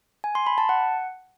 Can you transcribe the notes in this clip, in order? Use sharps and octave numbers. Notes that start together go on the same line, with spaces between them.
G#5
C6
B5
A5
F#5